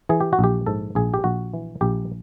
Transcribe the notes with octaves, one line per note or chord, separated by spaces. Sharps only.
E3 G#4
G4
F#4
A#1 G4
G#2 A4
A#1 G#4
G4
A#1 F#4
E3
A#1 G4